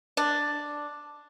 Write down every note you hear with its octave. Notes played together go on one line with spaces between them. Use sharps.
D4